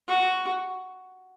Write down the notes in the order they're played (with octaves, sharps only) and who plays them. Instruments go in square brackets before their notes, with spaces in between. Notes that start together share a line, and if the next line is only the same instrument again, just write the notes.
[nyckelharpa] F#4